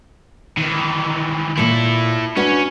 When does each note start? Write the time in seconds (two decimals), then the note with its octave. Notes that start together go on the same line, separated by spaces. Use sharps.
0.57 D#3 E3
1.58 A#2 A#3 E4 A4
2.36 C#4 D4 F#4 B4